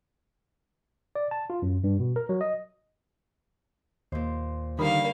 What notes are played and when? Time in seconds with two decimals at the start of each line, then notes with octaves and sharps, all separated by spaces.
1.15 D5
1.31 A5
1.50 F4
1.62 F#2
1.84 G2
2.00 B2
2.16 A#4
2.29 F#3
2.41 D#5
4.12 D#2 A#2 C5
4.79 G2 D3 D#3 A#3 F5 B5